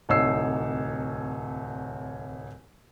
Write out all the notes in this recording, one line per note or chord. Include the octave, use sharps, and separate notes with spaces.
D1 C2 D#4 C#5 E6 C7